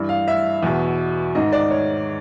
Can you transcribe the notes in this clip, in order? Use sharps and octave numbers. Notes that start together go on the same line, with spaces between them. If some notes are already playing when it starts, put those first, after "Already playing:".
Already playing: G2 E3
F5
E5
E2 B2
G#2 D#3 D#5
D5
C#5